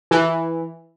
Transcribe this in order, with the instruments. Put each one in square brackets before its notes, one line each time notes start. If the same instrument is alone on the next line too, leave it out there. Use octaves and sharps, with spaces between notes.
[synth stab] E3